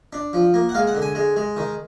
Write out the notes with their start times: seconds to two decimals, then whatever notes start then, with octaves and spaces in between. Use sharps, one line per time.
0.13 D4
0.33 F3
0.54 A#3
0.69 F#5
0.74 G#3 F5
0.87 F#5
0.95 D3
1.02 G#5
1.15 G#3
1.36 G#3
1.57 D#3